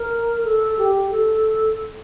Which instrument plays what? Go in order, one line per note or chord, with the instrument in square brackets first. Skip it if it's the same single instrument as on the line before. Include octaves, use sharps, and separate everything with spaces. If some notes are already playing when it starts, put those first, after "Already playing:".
Already playing: [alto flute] A#4
A4
G4
A4